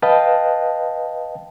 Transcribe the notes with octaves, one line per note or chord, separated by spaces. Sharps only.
B4 D#5 F5 G5 A5